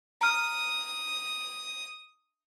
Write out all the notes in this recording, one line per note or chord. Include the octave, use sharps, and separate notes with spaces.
A#5 D#6 F6